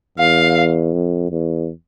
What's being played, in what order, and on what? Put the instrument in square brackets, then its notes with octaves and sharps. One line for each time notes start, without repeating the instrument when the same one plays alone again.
[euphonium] E2 [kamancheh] F5
[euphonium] F2
E2